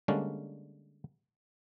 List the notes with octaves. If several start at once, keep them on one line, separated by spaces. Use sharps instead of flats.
D3 G3 G#3 A#3 C#4 D4